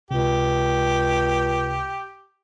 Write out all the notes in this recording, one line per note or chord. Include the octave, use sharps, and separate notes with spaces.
C#2 C3 G4